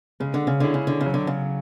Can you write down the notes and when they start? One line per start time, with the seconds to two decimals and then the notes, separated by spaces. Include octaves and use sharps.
0.20 C#3 G#3
0.34 D3
0.47 C#3
0.60 D3 C#4 E4 G#4
0.74 C#3
0.87 D3
1.01 C#3
1.06 F#3
1.14 D3
1.27 C#3